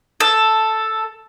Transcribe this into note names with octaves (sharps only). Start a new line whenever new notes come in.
A4